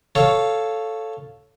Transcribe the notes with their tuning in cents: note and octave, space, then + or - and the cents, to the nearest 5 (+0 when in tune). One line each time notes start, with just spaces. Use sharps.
A4 +0 C#5 +0 F5 +0